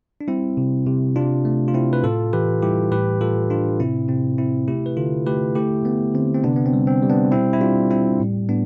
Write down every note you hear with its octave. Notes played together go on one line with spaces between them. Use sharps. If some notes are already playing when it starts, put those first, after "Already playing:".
D4
G3 C4 E4
C3
C3
C3 D4 F4
A3
F4
C3 C4 E4
B4
A2 F4 A4
E3 G4 B4
G3 E4 G4
A2 G4 B4
A2 F4 A4
A2 D4 F4
C3 C4 E4
C3 C4
C3 C4 E4
A3 E4 G4
B4
D3 F4 A4
A3 G4 B4
A3 E4 G4
A3 B3
D3 C4
C4
C3 B3 D4
B3
C4
G3
C4
G3
B3 D4
B2 C4 E4
E4
G3 D4 F4
G3 C4 E4
A2
A2 B3 D4